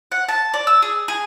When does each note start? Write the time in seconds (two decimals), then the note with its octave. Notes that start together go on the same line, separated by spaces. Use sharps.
0.12 F#5
0.28 A5
0.54 D5
0.67 E6
0.82 G#4
1.08 G#4